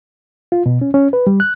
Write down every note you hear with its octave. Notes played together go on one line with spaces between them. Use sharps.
F4
B2
C#4
C#4
B4
G3
F#6